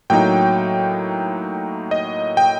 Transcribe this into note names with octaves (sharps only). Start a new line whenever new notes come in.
A2 F#3 A#3 D#4 G5
D#5
G5